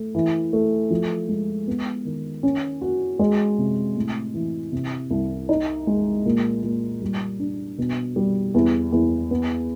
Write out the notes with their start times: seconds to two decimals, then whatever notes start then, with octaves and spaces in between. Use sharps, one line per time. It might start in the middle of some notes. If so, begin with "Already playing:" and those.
Already playing: A3
0.15 E3
0.53 A3
0.90 F3
1.29 G#3
1.68 B3
2.05 D#3
2.43 C#4
2.81 F#4
3.19 G#3
3.58 C3
3.96 A2
4.34 E3
4.72 C3
5.10 C2
5.49 D#4
5.87 G#3
6.25 A#2
6.63 A#2
7.01 G3
7.39 D4
7.78 B2
8.16 G3
8.54 E2
8.92 E2
9.31 B3